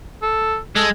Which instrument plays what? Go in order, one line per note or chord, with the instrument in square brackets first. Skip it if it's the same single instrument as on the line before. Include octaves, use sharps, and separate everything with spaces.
[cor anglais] A4
[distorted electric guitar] G#3 [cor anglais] A4